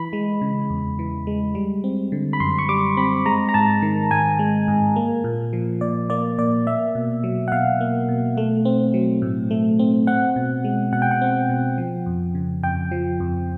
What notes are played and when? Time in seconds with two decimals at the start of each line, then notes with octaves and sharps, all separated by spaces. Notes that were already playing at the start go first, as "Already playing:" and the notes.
Already playing: E3 B5
0.13 G#3
0.41 C#3
0.70 E2
0.99 E3
1.27 G#3
1.55 G3
1.84 C4
2.12 D3
2.33 B5
2.40 F#2 C6
2.59 C#6
2.69 G3 D6
2.97 C4 B5
3.26 G#3 A#5
3.49 A#5
3.54 G#2 A5
3.82 D#3
4.11 G#2 G#5
4.39 G#3
4.68 G#2
4.96 A#3
5.24 A#2
5.53 F3
5.81 A#2 D5
6.10 A#3 D5
6.38 A#2 D5
6.67 A#3 E5
6.95 B2
7.24 F#3
7.48 F#5
7.52 B2 F5
7.81 A#3
8.09 B2
8.38 A3
8.65 C4
8.94 F#3
9.22 A2
9.51 A3
9.79 C4
10.07 C4 F#5
10.36 B2
10.64 G#3
10.93 B2 F#5
11.02 G5
11.11 F#5
11.22 C4
11.49 B2
11.78 F3
12.06 F2
12.35 C#3
12.63 F2 G5
12.92 F3
13.20 F2